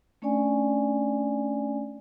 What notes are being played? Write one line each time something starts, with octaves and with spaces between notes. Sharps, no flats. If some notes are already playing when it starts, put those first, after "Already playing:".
A3 C#4 D4 D5 G#5